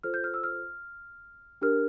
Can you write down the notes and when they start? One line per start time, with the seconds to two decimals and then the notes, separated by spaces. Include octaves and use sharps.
0.03 F4 A4 C5 F6
0.14 G6
0.24 F6
0.34 E6
0.43 F6
1.62 D4 G4 A#4 F6